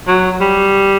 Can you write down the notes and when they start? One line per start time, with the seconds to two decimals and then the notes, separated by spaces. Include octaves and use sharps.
0.07 F#3
0.41 G3